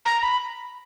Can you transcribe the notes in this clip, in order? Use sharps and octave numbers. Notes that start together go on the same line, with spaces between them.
A#5
B5